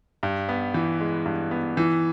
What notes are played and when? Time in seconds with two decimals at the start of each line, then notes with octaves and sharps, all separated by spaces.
0.23 G2
0.49 B3
0.74 E3
1.01 G#3
1.26 G2
1.51 B3
1.77 E3